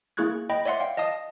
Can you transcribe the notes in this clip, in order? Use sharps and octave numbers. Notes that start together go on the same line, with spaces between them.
A#3 E4 G#4 C#6 F#6 G#6
D#5 G5 B5
C#5 D5 E5 F#5 C6
F5 G5
D#5 F5 A5 D#6